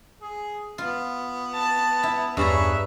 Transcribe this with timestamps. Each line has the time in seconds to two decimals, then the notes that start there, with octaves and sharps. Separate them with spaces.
0.21 G#4
0.78 B3 F4
1.54 A5
2.03 E4
2.37 E2 G2 G#4 B4 C#5 E5 A5 A#5